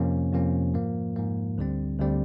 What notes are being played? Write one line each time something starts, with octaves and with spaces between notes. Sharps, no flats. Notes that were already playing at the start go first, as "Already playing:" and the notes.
Already playing: F2 C3 F3 A#3 C#4
F2 C3 F3 A#3 C#4
G#2 F3 A#3
G#2 F3 A#3
D2 D3 G3 C4
D2 D3 G3 C4